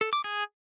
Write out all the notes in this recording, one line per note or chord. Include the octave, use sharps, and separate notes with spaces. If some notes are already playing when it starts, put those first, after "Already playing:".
A4
D6
G#4